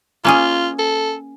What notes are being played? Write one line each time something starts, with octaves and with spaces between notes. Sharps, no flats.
A#3 C#4 F4 G#4
A4